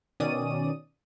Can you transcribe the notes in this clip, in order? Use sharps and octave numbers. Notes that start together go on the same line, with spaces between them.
B2 D#3 C#4 D5 D#6 D#7